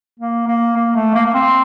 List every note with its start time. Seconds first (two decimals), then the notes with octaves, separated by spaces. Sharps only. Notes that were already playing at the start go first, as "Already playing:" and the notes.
0.19 A#3
0.47 A#3
0.76 A#3
0.95 A3
1.14 A#3
1.26 A#3
1.34 C4